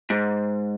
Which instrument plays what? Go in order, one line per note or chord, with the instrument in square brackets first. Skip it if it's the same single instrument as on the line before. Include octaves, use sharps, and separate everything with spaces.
[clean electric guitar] G#2